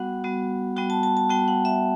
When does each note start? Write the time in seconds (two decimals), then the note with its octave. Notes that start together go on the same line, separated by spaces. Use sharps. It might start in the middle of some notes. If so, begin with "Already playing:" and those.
Already playing: G3 B3 F#4 F#5
0.24 G3 B3 F#4
0.77 G3 B3 F#4 G5
0.90 A5
1.03 A5
1.17 A5
1.29 G3 B3 F#4 G5
1.48 F#5
1.65 E5